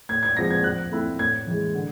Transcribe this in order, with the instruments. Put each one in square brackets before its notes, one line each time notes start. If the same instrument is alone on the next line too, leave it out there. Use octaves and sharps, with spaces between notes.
[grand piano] A2 G#6
G#6
F3 G#3 C4 A#6
G#6
F3 F#6
A3 C4 E4
A2 G#6
E3 G#3
D3